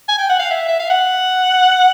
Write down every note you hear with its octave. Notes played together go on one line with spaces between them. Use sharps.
G#5
G5
F#5
F5
E5
E5
F5
F#5